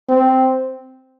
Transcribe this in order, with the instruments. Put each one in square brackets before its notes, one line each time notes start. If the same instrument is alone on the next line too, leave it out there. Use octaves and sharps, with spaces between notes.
[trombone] C4